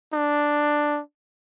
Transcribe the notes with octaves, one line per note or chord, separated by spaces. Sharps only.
D4